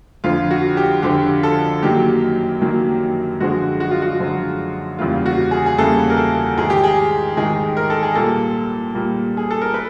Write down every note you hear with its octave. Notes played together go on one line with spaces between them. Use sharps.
F2 D3 F3 F4
F#4
G4
F2 D3 F3 G4
A4
F#2 D#3 F#3 A#3 G4
F#2 D#3 F#3 A#3
F#2 D3 F3 G#3 F#4
F#4
F4
F#4
F#2 D3 F3 G#3
E2 C#3 E3 G3 A#3 F4
F#4
G#4
G#4
E2 C#3 E3 G3 A#3 A4
A#4
A4
G#2 D#3 G#3 G#4
G4
G#4
G#2 D#3 G#3 G#4
A#4
A4
G#4
A#2 G3 A#3 A4
A#2 G3 A#3
G#4
A4
A#4
B4